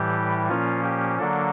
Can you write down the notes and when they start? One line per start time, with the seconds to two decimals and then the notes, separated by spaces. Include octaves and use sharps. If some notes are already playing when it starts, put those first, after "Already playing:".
Already playing: A2 E3 G3 G4
0.49 A#2 F3 A#3 C#4 F4
0.83 G4
1.18 D3 F#3 A#3 D4 A4